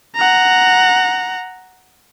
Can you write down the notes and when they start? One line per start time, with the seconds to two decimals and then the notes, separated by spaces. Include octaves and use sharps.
0.16 F#5 A#5